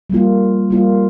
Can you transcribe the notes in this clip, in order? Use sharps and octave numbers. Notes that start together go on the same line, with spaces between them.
G3 A#3 F4
G3 A#3 F4